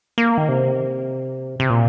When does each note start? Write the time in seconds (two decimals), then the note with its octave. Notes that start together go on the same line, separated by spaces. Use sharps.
0.18 A#3
0.38 D#3
0.49 C3
1.60 C3
1.70 A#2